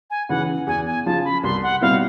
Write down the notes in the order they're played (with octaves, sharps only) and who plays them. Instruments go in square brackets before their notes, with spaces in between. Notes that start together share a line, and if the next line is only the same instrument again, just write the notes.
[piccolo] G#5
[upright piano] C#3 E3 [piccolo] F#5
[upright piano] E2 [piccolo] G#5
[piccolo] G#5
[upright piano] C#3 F3 [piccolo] A5
[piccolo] B5
[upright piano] C2 [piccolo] C6
[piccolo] F#5
[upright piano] B2 G3 C4 E4 [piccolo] F5